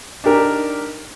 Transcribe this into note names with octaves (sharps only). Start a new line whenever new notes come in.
D4 D#4 G4 A#4